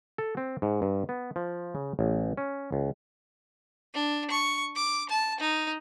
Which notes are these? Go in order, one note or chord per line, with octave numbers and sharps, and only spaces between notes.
A4
C4
G#2
G2
B3
F3
C#3
A1
C#4
C#2
D4
C#6
D6
A5
D#4